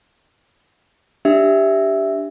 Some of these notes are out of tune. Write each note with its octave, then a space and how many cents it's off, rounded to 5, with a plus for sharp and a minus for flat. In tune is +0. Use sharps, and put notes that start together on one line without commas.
D4 +0 G4 +0 E5 +0